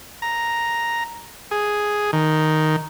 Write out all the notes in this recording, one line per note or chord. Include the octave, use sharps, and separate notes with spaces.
A#5
G#4
D#3